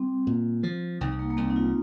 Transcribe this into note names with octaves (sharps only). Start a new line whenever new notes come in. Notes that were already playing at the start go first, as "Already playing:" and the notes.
Already playing: G3 C4
A#2
F3
C2 D#4
A#3
A#3
C2 C4
D#4
F4